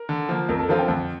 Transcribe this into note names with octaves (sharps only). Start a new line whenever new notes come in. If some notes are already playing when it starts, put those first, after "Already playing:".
Already playing: A#4
D3
F3 A#3
F2 A#4
A4
D3 F3 C4 F4 A#4
G5
F2